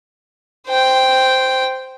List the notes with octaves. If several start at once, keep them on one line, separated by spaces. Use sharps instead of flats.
C5 G5